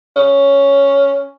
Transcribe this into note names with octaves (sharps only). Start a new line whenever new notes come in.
C#4